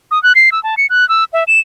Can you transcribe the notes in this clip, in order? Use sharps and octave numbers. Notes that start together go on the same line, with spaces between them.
D#6
F#6
C7
E6
A5
C#7
F#6
E6
E5
E7